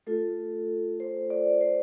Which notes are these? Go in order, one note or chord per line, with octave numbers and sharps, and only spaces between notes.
A3 F4 A4
C5
D5
C5